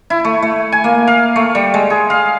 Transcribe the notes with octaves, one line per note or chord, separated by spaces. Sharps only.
E4
A3
A3
G#5
A#3
F5
A3
G3
G#3
G#4
F5